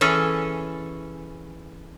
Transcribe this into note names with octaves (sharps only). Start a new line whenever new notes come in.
E3 C#4 G#4 A4